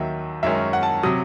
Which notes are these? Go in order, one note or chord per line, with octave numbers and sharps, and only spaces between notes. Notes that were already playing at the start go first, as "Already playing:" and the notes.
Already playing: D#2 D#3 F#3 E5
F#2 D#3 G#3 C#4 E5
F#5
A5
C3 F#3 D#6